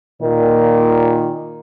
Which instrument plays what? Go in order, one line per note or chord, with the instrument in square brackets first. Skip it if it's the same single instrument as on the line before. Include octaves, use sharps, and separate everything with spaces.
[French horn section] A#2 [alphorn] D#3